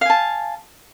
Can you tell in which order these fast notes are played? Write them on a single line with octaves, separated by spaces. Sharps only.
F5 G#5 A5